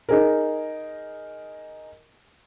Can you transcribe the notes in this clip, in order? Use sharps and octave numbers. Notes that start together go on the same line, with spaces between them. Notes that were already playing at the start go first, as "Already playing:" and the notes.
D#4 G#4 A#4